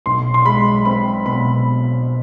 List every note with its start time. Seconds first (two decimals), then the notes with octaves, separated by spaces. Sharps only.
0.06 B1 C6
0.34 C6
0.46 G#3 B5
0.85 C4 B5
1.26 B2 B5